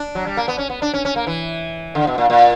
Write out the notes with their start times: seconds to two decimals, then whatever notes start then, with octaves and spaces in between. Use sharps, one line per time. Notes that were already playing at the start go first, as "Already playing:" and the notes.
Already playing: D4
0.15 F#3
0.26 G3
0.37 A#3
0.48 B3
0.58 C#4
0.70 B3
0.82 D4
0.94 C#4
1.05 C#4
1.16 A#3
1.27 E3
1.95 D3
2.07 B2
2.18 A#2
2.30 A#2